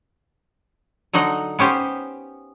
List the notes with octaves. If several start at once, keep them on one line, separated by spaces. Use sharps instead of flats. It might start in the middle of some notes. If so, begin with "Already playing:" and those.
D3 F#3 D#4 D#5 F#5
B3 C#4 G4 C5